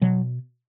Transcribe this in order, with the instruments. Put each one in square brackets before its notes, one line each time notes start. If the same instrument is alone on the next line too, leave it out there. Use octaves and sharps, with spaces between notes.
[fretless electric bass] B2 F#3